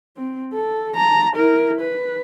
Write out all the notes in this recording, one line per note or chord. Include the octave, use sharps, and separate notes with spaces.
C4
A4
A5 A#5
E4 A#4
B4